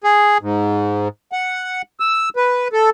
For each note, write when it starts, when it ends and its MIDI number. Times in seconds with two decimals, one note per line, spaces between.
0.04 0.38 68
0.41 1.08 44
1.32 1.82 78
2.00 2.29 88
2.36 2.68 71
2.73 2.90 69